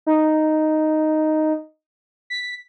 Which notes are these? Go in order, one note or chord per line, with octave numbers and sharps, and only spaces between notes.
D#4
B6